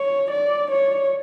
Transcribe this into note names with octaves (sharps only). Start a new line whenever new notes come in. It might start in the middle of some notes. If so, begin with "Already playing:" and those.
Already playing: C#5
D5
C#5